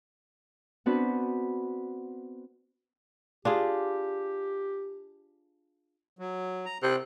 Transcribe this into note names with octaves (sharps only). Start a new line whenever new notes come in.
B3 C4 D4 F#4 B4
D4 F4 G4 G#4
F#3
A#5
C3 G5 F#6